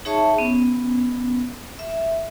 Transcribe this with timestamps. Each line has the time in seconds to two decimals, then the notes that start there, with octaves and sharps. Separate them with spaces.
0.05 D#4 G#4 C#5 E5 A5 C#6
0.38 B3 C#4
1.79 E5